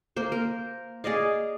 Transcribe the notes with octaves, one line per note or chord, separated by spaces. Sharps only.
A#3 C5
A#4
G#4 D5 D#5 F5